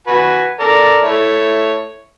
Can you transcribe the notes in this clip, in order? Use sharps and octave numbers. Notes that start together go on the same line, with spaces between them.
F#4 B4 G#5
A4 A#4 D5
A3 E4 C#5